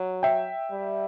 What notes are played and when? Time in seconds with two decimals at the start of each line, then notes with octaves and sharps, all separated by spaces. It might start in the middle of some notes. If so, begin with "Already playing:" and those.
Already playing: F#3
0.23 E5 G5
0.71 G3